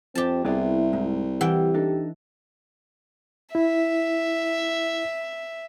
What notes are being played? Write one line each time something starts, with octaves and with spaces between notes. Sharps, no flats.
F2 C4 G4 A5
C2 B3 E4 G#4 D5
G#2
E3 G3 G4 F#5 G5
D4 D#4 A4
E4 E5